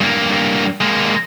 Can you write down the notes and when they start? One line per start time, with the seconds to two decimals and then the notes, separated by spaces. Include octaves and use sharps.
0.01 G2 A#3
0.81 G#3 A#3